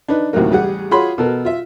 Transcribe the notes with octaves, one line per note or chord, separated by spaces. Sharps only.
D4 D#4 B4
D2 A2 C3 D#3 F#3 A#3
A1 G3 G#4 F#5
F4 F#4 G#4 C#5 B5 C6
B2 A4 A#4
F4 E5